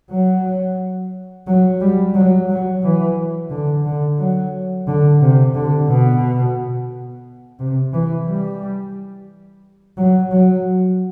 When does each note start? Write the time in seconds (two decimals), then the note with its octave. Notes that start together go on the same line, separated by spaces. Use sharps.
0.10 F#3
1.47 F#3
1.81 G3
2.15 F#3
2.49 F#3
2.83 E3
3.50 D3
3.85 D3
4.18 F#3
4.87 D3
5.21 C3
5.55 D3
5.89 B2
7.60 C3
7.93 E3
8.27 G3
9.97 F#3
10.31 F#3